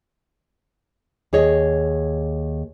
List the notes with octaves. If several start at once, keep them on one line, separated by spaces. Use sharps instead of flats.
D#2 G#4 C#5 D#5